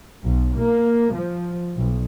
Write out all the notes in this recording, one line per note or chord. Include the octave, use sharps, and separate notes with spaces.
B1
A#3
F3
B1